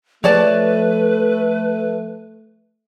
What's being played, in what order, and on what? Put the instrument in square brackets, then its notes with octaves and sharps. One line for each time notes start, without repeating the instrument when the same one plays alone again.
[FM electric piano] F3 [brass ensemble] A3 [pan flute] B4 [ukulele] C#5 D5 A5